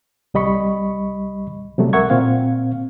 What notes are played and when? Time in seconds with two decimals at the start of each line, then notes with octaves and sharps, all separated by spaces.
0.34 C2 G3 D#5 B5 C#6
1.78 C3 F#3 G3 A3
1.93 C2 A#4 E5 F#5 C#6 G#6
2.10 A#2 C4 F5